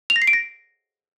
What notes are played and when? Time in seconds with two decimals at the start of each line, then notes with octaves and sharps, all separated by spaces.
0.10 F7
0.16 A#6
0.22 C7
0.27 D7
0.33 A#6